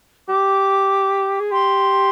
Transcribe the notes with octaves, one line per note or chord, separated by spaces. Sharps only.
G4 D6
G#4
G4 C6